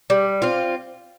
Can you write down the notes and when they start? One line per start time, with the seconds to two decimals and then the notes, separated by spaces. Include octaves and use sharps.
0.10 G3
0.42 C4 F4